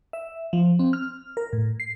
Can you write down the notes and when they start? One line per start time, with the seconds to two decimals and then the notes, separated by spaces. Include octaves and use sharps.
0.13 E5
0.53 F3
0.79 C4
0.93 F6
1.37 A#4
1.53 A2
1.80 C7